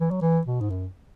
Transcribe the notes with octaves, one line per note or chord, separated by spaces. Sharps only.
E3
F#3
E3
B2
G#2
F#2